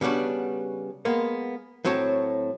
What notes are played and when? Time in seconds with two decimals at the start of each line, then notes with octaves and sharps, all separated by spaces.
0.01 C#3 G3 B3 D4 F#4
1.05 G#3 A#3 B3
1.85 A2 F#3 C4 C#5 A5